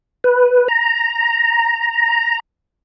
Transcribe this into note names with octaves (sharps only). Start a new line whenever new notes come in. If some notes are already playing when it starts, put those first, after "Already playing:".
B4
A#5